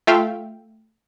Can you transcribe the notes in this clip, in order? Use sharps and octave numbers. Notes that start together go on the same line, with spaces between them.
A3 F4 E5 F5 G5